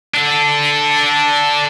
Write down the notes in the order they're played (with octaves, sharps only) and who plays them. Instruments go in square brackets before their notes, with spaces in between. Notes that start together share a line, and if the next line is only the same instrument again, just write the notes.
[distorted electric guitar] D4 A4